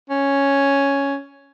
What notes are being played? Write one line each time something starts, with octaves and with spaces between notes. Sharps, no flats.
C#4